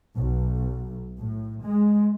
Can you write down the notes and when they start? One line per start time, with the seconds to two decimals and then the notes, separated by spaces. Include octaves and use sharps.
0.18 B1
1.18 A2
1.64 G#3